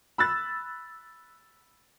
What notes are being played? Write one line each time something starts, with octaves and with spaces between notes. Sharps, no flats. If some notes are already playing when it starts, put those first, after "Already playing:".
B5 E6 F#6 A6